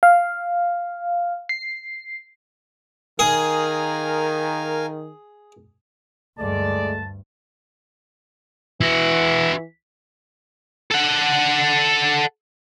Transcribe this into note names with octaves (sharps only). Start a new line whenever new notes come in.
F5
C7
D#3 G#4 A#4 F5 G#5
D2 G2 G#3 A3 D5 A5
E3 E4 F#4
A4 F#5